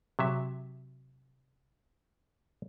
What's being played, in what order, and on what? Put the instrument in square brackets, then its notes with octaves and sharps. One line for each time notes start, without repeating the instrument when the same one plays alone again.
[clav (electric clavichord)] C3 F#3 E5